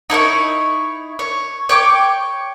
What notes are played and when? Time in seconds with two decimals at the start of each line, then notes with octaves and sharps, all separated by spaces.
0.10 D#4 E4 A4 C#5
1.19 C#5
1.69 C#5 G5 D6